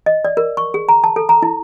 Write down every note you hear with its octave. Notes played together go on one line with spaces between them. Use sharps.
D#5
D5
A#4
C#6
G#4
A#5
A5
A4
A#5
E4